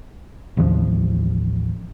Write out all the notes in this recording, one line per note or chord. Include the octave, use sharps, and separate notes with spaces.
A1 D#2 F3